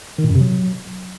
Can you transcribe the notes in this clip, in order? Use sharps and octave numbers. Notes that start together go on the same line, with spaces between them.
D#3
A#2
F#2
C3
F#3